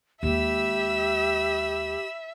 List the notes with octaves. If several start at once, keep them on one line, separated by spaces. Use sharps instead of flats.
D#2 G#3 G4 E5 B5 E6